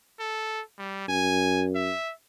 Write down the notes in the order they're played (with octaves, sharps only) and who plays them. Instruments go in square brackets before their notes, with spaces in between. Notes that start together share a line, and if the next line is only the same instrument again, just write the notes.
[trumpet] A4
G3
[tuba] F#2 [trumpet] G#5
[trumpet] E5